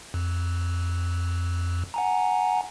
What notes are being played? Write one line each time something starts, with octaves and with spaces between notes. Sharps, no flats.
F2
F#5 G#5 A#5